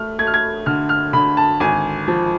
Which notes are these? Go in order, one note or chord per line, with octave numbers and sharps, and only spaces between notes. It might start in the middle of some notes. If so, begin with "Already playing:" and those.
Already playing: A3 F6
A3 G#6
F6
G#6
D3 F6
F6
D3 B5
A5
G#1 G#5
F3